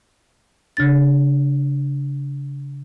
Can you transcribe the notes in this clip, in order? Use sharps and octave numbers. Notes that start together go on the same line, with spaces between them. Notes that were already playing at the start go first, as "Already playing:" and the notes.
C#3 D4 A6